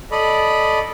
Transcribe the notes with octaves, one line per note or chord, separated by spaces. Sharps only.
A4 D5 D#5 B5